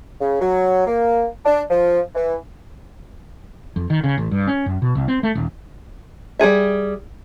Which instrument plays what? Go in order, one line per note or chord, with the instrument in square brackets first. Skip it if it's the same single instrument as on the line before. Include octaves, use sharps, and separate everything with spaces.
[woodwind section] C#3
F#3
A#3
D4
F3
E3
[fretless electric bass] F2
D#3
C#3
A1
G2
C#4
F#2
B2
C2
C4
A3
D#1
[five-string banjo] G3 F4 G#4 E5